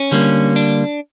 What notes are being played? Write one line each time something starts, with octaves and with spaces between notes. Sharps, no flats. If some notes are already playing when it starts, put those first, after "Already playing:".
Already playing: C#4
D3 G3 A#3
D4